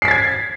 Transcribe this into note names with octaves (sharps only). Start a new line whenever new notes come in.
G#6 A6 B6 C7